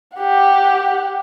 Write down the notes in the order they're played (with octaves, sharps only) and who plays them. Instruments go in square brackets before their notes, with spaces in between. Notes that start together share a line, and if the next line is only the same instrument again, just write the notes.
[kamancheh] G4 F#5